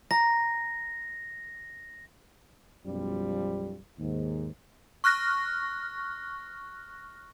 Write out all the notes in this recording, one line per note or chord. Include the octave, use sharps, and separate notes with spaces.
A#5 A#6
B1 F#2 F3 G3
D#2 G#2
C#6 F6 F#6 A#6